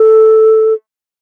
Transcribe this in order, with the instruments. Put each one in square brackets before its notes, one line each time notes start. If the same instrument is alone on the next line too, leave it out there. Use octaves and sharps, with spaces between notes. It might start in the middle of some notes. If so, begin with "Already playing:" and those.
Already playing: [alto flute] A4